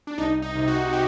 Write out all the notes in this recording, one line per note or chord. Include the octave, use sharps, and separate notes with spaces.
D4
C2 D#4
D#4
C3
F#4
G4